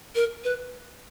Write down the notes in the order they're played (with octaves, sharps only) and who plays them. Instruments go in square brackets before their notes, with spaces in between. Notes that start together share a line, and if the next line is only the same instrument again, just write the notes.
[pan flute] A#4
B4